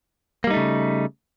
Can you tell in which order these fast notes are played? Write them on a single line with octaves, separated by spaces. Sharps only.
A#3 G3 D#4 A3 C#3